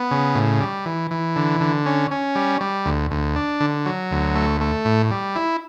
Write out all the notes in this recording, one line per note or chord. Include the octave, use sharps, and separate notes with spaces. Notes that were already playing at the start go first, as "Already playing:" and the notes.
Already playing: B3
C#3
A2
G3
E3
E3
D3
D3
C#4
C#4
G3
G3
D2
D2
D4
D3
F#3
D2
A3
A3
A2
G3
E4